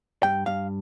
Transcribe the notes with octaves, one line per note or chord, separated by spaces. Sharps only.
G2 G5
G2 F5